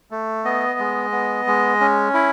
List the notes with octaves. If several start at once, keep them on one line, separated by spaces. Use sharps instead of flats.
A3
B3 D#5
G#3
B3
G#3
C#4
E4